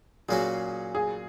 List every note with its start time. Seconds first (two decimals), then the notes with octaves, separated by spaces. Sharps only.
0.29 A#2 F#3 A#3 C#4 F#4 G#4
0.95 G#4